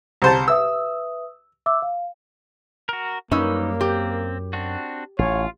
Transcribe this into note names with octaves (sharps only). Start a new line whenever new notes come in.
C2 C5 A5 A#5
B4 E5 D#6 E6
E5 D6 E6
F5
F#4 A#4
F#2 G3 A#3 C#4 D#4 B4 E6
C4 G4
C4 D4 F#4
A1 F4 C#5